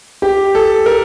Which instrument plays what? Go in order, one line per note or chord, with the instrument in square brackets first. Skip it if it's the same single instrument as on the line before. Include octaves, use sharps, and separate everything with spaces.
[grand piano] G4
A4
A#4